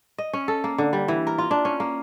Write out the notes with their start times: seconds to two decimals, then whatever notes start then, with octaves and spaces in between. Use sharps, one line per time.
0.18 D#5
0.33 C#4
0.48 A4
0.64 A#3
0.78 D3
0.93 G3
1.08 E3
1.27 A#4
1.38 F4
1.51 D4
1.65 C#4
1.80 A#3